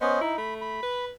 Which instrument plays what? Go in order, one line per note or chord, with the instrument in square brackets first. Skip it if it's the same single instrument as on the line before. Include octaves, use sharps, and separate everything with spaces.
[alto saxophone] B3 [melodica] C#4 C5 D#5
[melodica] D#4 [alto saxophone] E4
[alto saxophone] A3 [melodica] B5
[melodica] B5
[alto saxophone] B4